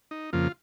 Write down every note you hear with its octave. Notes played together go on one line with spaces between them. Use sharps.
D#4
F2 C#3 F3 A#3 F4